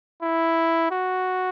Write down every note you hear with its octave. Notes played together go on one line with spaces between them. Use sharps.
E4
F#4